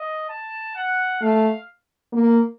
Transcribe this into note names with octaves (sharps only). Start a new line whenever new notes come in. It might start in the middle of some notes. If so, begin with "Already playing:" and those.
Already playing: D#5
A5
F#5
A3 F5
A#3